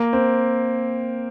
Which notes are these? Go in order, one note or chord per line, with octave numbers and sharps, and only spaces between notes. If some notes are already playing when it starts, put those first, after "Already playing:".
Already playing: A#3
C4